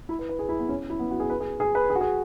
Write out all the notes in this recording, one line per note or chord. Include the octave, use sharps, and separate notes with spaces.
E4
B4
B4
G#4
E4
B3
C#4
E4
B3
F#4
G#4
B4
G#4
G#4
B4
G#4
F#4
G#4